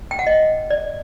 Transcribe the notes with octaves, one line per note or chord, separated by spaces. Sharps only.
G5
F#5
D#5
D5